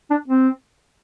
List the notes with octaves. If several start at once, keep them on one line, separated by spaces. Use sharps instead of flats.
D4
C4